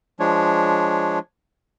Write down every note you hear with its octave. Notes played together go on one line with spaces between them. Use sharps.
F3 G#3 D4 C#5